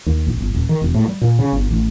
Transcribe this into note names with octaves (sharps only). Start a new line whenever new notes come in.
D#2
A#1
G1
D#1
D#3
E1
A2
G3
A#2
C#3
G1
A1